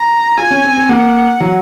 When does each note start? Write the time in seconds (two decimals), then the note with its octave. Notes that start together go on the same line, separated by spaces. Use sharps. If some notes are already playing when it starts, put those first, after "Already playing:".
Already playing: A#5
0.37 F4 G#5
0.51 C#4
0.64 C4
0.76 C4
0.89 A#3 F#5
1.40 F#3